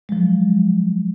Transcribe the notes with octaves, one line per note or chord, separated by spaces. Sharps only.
F3 F#3 G#3